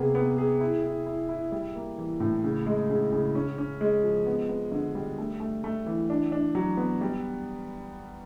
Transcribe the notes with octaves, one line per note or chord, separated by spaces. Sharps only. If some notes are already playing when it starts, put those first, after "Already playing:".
Already playing: C3 A#3 B3 G#4
B3
G#4
E4
E4
E4
E4
G3
A#3
E3
A2
C#3
G#3
C#3
C#3
C#4
C#4
G#3
F3
B3
B3
D3
G3
A3
A3
A3
E3
D4
D4
F#3
B3
G3